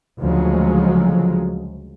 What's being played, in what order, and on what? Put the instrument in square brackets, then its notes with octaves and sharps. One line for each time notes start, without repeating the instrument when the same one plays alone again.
[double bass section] D2 C#3 F3 F#3 G#3